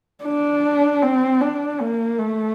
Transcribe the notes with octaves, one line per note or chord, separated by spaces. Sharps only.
D4
C4
D4
A#3
A3